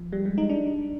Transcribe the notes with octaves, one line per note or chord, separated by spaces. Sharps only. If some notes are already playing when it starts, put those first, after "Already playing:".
Already playing: F3
G3
G#3
D#4
D4